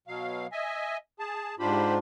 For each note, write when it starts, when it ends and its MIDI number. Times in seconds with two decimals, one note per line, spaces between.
0.08 0.47 47
0.08 0.47 54
0.08 0.47 77
0.52 0.97 75
0.52 0.97 76
0.52 0.97 80
1.19 1.55 68
1.19 1.55 81
1.59 1.98 44
1.59 1.98 62
1.59 1.98 65
1.59 1.94 67
1.59 1.94 72
1.59 1.94 83